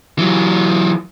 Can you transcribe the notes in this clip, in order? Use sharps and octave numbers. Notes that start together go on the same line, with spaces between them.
E3 F#3